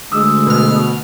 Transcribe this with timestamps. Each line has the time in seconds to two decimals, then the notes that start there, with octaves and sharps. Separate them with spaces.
0.12 D2 G#3 D#6 E6
0.47 B2 F6